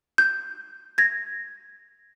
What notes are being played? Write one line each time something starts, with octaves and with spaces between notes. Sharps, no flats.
G6
G#6 A#6